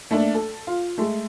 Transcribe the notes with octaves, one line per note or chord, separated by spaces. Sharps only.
A3 A#3 D4
A4
F4
G#3 A3